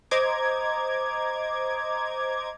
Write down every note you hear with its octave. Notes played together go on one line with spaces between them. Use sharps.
C5 D#5 A#5 D6 G#6